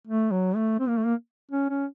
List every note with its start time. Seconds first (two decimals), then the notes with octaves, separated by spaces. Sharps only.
0.07 A3
0.31 F#3
0.56 A3
0.79 C4
0.88 A#3
0.97 A3
1.05 A#3
1.51 C#4
1.69 C#4